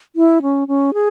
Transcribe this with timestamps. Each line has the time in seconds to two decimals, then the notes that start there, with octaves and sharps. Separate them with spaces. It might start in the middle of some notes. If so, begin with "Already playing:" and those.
0.16 E4
0.42 C#4
0.68 C#4
0.94 G#4